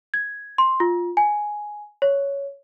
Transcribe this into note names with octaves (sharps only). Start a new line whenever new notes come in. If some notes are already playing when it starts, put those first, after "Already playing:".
G#6
C6
F4
G#5
C#5